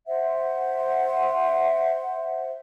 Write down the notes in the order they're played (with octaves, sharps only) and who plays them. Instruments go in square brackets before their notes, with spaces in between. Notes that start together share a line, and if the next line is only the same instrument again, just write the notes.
[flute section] C5 E5 F#5